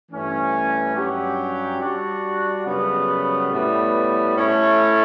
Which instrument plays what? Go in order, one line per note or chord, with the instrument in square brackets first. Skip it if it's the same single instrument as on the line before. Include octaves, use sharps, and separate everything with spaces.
[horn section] G2 E3 A3 C#4
G2 F#3 C#4 G4
G3 D4 F#4
F#2 C#3 G3 B3
A2 G3 B3
A3 C#4 E4 A4 C#5